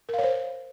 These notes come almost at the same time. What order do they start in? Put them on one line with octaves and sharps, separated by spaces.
A#4 F5 C#5 C5